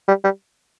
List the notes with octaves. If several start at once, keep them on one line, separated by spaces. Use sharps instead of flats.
G3
G3